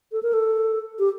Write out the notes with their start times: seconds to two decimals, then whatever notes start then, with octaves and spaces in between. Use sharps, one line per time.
0.12 A4
0.23 A#4
0.33 A4
0.99 G4